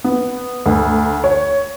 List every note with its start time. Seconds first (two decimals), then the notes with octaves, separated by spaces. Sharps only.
0.04 B3
0.66 D2
1.24 C#5